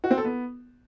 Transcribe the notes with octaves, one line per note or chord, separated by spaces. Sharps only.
F#4
C4
A4
B3